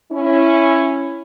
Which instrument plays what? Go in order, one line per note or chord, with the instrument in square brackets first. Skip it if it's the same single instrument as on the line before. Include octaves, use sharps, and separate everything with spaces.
[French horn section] C#4 E4